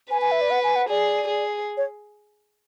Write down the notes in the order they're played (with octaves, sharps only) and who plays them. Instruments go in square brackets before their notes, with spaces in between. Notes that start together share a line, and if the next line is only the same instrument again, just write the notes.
[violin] B4 [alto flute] G#5
[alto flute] G#5
E5
D5
F#5
G#5
F#5
[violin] G#4 [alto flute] D5
[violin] G#4
[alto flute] C#5